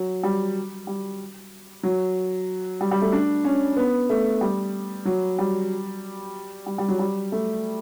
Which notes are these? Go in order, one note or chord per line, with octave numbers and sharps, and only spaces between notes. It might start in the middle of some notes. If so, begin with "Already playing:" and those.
Already playing: F#3
G3
G3
F#3
G3
G3
A3
D4
C#4
B3
A3
G3
F#3
G3
G3
G3
F#3
G3
A3